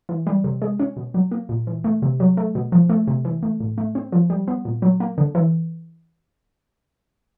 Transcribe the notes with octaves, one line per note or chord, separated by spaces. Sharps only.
E3
G3
C3
G#3
C#4
B2
F#3
A#3
A#2
E3
A3
C3
F#3
A3
B2
F3
A3
C3
E3
A3
A2
A3
C4
F3
G3
B3
A#2
F#3
A#3
D3
E3